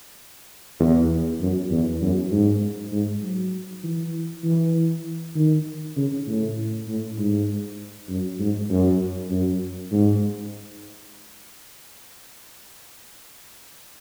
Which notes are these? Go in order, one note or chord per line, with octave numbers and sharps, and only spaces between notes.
E2
F#2
E2
F#2
G#2
G#2
F#3
E3
E3
D#3
C#3
A2
A2
G#2
F#2
G#2
F#2
F#2
G#2